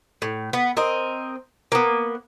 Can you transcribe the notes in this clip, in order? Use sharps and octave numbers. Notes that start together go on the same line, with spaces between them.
A2
B3
C4 A#4 D#5
A#3 B3